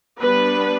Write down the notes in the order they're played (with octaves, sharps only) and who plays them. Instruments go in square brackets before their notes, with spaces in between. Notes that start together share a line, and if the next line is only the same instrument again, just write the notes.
[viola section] G3 B3 D4 B4